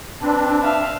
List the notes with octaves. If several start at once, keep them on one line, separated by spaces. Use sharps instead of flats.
C4 D4 B4
E5 F5